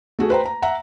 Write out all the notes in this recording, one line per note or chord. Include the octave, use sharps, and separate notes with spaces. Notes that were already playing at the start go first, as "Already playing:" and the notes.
A3 F#4 G#4
B4 C5 G5 A#5
A#5
E5 F#5 A#5